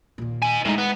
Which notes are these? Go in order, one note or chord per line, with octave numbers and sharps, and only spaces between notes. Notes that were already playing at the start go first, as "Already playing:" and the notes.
D#2 A#2
D#4 G#5
A2 G#3 D#4
B3